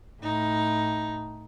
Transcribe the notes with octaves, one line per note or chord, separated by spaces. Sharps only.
A2 D#4